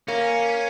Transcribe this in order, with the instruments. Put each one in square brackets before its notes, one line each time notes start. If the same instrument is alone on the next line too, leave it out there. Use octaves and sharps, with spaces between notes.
[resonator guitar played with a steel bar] A#3 [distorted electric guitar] C#4